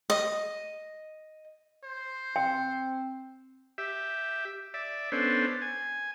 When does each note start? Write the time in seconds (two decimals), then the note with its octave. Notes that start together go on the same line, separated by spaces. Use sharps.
0.10 D#5
1.84 C5
2.36 C4 G5
3.78 G4 E5
4.74 D5 E5
5.12 B3 C#4 D4 A4 C5
5.62 G#5